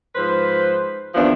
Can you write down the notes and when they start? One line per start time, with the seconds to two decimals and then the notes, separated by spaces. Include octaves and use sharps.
0.14 G#2 F3 B4 C5
1.14 D#2 E3 F3 B3 D4